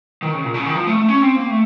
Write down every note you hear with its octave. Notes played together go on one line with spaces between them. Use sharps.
D#3
C#3
A#2
C#3
D#3
F3
A3
A3
C#4
C4
A#3
A3